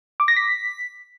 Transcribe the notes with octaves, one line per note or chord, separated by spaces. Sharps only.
D6
A#6
B6